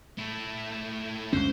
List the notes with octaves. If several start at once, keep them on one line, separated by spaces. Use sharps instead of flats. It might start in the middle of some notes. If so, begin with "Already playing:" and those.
A3 E4
C#2 F#2 D3 C#4 C5